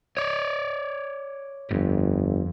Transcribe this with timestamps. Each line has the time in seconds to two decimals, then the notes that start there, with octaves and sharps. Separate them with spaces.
0.17 C#5 D5
1.71 G1 F2 G#2